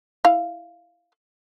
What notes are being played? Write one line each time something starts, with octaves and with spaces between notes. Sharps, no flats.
E4 F5